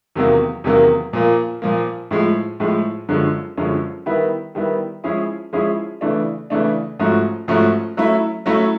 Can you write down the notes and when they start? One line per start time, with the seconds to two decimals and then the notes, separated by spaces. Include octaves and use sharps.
0.15 E2 C3 D#3 F#3 A#3
0.64 E2 C3 D#3 F#3 A#3
1.13 A#2 F3 A#3
1.62 A#2 F3 A#3
2.11 A2 F3 G#3
2.60 A2 F3 G#3
3.09 F#2 D3 F3 G#3 C#4
3.57 F#2 D3 F3 G#3 C#4
4.06 D#3 G3 B3 E4
4.55 D#3 G3 B3 E4
5.04 F3 G#3 C#4 E4 G#4
5.53 F3 G#3 C#4 E4 G#4
6.01 C#3 E3 A3 D4
6.50 C#3 E3 A3 D4
6.99 G#2 F3 A3 C#4 F#4
7.48 G#2 F3 A3 C#4 F#4
7.97 F#3 A3 C#4 E4
8.46 F#3 A3 C#4 E4